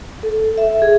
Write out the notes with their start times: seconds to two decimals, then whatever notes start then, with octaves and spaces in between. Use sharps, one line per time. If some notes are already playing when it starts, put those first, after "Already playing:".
0.23 A4
0.58 E5
0.82 G#4